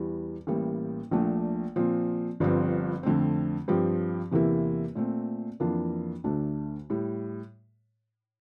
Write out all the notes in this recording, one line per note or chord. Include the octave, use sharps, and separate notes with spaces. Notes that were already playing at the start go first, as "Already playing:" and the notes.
Already playing: E2 E3 G3
A1 A2 G3 A#3
A#1 A#2 A3 D4
A#2 F3 C4
G1 G2 F3 C4
F2 D3 A3 C4
G2 F3 C4 G4
E2 C3 E3 A#3 E4
A#2 A3 C4
F2 E3 A#3 D4 F4
D2 D3 A3 D4
A2 G3